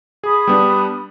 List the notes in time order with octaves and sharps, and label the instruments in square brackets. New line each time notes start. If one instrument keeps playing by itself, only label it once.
[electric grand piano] G#4 [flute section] B5 D#6
[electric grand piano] G3 B3 D4